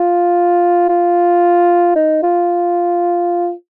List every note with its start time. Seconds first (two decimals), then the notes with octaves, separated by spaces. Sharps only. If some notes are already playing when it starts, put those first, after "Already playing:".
Already playing: F4
0.89 F4
1.96 D#4
2.23 F4